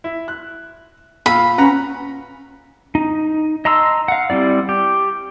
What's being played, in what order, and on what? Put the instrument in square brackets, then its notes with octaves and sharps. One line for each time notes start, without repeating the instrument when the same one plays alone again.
[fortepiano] E4
F#6
[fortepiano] A#2 F5 E6 [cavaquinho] B5
[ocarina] C#4 [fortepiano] B4 F#5 A#5
[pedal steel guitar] D#4
D#5 A5 A#5 C6 E6
F5 F#5
G3 C4 E4 D5
G4